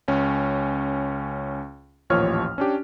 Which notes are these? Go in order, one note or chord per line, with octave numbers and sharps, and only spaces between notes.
C#2 C#4
A1 D#2 A#2 F3 C#5 F6
C#4 D4 G4